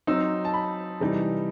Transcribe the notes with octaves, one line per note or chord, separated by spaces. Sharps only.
F#3 C4 D#4 E6
A5
B5
C3 E3 G3 D#4